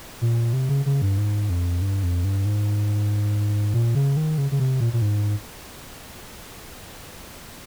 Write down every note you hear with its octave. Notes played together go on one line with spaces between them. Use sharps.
A#2
C3
C#3
C#3
G2
G#2
F2
G2
F2
G2
G#2
A#2
C#3
D#3
C#3
C#3
C3
A#2
A#2
G#2